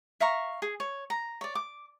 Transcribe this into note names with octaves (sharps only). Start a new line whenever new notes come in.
E5 F5 A#5 C#6
G#4
C#5
A#5
C#5 D5
D6